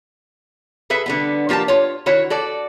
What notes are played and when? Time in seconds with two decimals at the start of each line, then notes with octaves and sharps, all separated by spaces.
0.90 G#4 A4 B4 E5
1.06 D3 G3 B3
1.49 F3 A#3 G4 A#4 A5
1.68 F4 C#5
2.06 D#3 E4 F#4 C#5
2.30 F#4 A4 D5